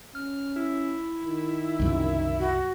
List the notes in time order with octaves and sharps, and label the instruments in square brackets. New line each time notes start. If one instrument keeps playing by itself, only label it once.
[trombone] C#4 [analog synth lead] F6
[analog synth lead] E4
[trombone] D#3
[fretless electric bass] C2 F#2 C#3
[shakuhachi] F#4